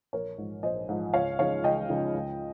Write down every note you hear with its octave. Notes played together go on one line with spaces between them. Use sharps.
A#1 A#4 C#5
G#2 F3
A#1 C5 D#5
G#2 F3
C#2 C#5 F5
C#3 F3 G#3 D#4 C#5 F5
C#2 D#5 G5
C#3 F3 G#3 D#4
C#2